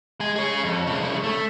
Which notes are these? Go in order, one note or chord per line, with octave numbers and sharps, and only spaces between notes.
G#3 G#5
G#4 C#5
F2
C2 C#3
A3